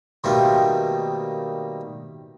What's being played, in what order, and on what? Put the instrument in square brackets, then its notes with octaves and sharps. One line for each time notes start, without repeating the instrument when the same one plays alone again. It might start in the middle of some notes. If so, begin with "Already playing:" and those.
[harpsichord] B2 D#3 G3 A3 A#3 C4